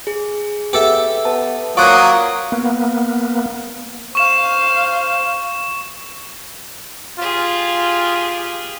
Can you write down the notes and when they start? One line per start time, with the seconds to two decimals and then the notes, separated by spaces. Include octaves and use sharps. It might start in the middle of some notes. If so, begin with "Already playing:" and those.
0.07 G#4
0.73 B3 G4 A4 E5
1.25 B3 A5
1.77 F#3 A#3 F4 C5 D5 C#6 D#6 F#6
2.52 A#3 B3
4.15 C5 F5 C#6 E7
7.19 F4 G4 G#4